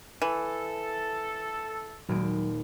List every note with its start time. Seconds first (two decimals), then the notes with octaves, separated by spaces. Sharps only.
0.22 E3 A4
2.09 D#1 F#3 G#3 D7